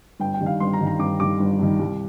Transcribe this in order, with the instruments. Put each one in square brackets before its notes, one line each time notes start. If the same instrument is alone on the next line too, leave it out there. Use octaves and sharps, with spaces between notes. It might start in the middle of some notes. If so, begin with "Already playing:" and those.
[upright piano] G1 G5
G5
G2 D#3
F5
G1 C6
A#5
G2 D#3
A#5
G1 D6
G2 D#3 D6
G1
G2 D#3
C2